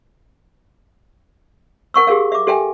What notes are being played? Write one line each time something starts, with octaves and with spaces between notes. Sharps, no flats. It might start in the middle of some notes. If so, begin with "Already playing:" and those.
A#4 F#5 C#6 E6
G4 G#4 A#4 F5
E5 D6
G4 A4 E5 G5 G#5